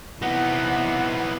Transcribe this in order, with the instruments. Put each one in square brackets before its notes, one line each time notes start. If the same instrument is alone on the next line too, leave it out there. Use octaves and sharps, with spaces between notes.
[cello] C3 E3 [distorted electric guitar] B3 D#4 [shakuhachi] F#5